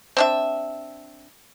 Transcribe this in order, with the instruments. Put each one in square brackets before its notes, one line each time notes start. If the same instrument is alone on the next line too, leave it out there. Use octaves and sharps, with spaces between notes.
[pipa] C4 D4 E5